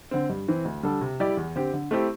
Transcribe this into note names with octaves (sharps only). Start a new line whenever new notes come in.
D3 C4
G2
E3 C4
D2
D3 G3 D4 A4
C3
G3 E4 G4 D5
E2
D3 C4 G4
D3
A3 C4 E4 G4